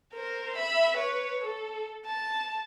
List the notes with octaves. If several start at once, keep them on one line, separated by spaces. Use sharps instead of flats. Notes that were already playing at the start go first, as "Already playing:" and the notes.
A#4 C5
E5 B5
B4 C#5
A4
A5